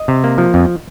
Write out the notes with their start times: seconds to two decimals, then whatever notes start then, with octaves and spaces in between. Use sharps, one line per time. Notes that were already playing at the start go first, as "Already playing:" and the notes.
Already playing: D#5
0.08 C3
0.24 A#3
0.38 F3
0.54 F2